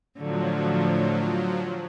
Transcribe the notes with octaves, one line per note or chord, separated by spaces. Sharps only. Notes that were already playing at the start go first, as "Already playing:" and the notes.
A2 D3 F3 F#3